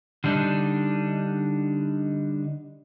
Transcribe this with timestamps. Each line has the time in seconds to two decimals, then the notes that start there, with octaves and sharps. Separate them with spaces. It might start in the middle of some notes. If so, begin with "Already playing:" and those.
0.24 D3 G3 D4 D#4